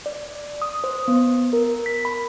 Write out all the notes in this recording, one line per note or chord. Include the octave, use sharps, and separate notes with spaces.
D5
D#6
C5
B3
A#4
B6
B5